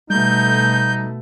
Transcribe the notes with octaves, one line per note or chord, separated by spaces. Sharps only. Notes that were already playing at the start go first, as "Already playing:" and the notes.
B2 G3 A3 D#4 G6